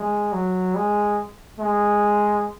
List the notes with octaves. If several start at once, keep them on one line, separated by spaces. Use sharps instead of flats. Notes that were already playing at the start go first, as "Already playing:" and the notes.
Already playing: G#3
F#3
G#3
G#3